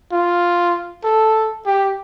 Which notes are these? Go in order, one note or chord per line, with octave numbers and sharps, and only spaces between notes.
F4
A4
G4